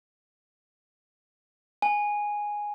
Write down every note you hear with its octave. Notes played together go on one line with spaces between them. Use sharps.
G#5